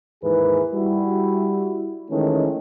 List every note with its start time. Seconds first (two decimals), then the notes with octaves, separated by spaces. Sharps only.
0.23 D#2 G#2 E3 G#4 A#4 B4
0.73 G3 E4 F#4
2.10 D#3 E3 G#3 A3 C#4